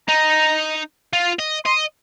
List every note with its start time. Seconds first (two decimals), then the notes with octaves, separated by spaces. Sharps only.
0.08 D#4 A#5
1.13 F4
1.39 D#5
1.66 D#5 C6